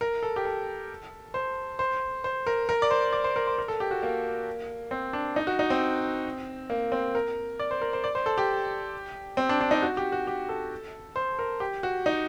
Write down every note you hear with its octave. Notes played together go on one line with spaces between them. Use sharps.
A#4
A4
G4
A4
C5
C5
C5
A#4
A#4
D5
C5
D5
C5
A#4
C5
A#4
A4
G4
F#4
A#3
C4
D4
D#4
F#4
D#4
C4
A#3
C4
A#4
D5
C5
A#4
C5
D5
C5
A4
G4
C4
D4
D4
D#4
F#4
G4
F#4
G4
A4
C5
A#4
G4
F#4
D#4